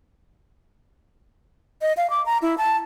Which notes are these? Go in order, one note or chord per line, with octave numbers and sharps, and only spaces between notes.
D#5
F5
D6
A#5
E4
A5